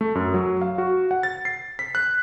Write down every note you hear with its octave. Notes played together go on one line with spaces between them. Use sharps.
A3
F#2
F#3
F5
F#4
F#5
A6
C7
B6
F#6